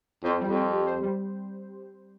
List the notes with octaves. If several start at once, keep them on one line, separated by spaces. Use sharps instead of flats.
F2 C5
G3
F2
C4
G4
C5
G3